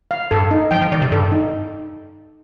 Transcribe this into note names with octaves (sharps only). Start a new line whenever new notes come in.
F5
G2 A4
D#4
F3 G5
F3
D#3 D5
C3
G2 A4
D#4